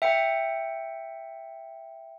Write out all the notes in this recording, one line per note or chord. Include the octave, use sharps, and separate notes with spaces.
E5 G5 C#7